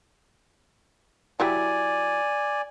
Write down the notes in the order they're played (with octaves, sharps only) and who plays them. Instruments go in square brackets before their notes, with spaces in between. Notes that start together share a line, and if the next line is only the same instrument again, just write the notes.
[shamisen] F#3 E4 G4 [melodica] D5 G#5